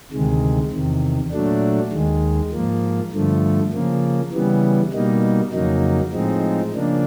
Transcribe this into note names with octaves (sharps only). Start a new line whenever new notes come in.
D2 C3 D#3 G#3
E2 C3 D#3
A#2 F#3 A3 D4
D#2 D#3 G#3
G#2 F3 A#3
G2 D3 F3 A3
C#3 F3 A#3
C#3 E3 G3 B3
B2 G3 A#3 D#4
F2 C#3 F#3 A#3 D#4
A2 F3 G#3 C4 D#4
C#3 F3 A#3 D4